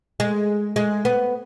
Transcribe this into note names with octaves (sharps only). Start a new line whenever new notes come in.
G#3
G#3
B3